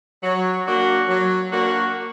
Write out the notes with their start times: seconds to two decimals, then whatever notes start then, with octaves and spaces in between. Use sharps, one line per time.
0.23 F#3
0.66 A#3 D4 F#4
1.08 F#3
1.52 A#3 D4 F#4